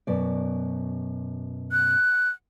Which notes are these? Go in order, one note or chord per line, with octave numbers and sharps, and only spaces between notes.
F#2 B2 D5
F#6